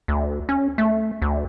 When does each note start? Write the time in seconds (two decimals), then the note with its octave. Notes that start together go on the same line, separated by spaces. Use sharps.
0.08 D2
0.49 C#4
0.78 A3
1.22 D2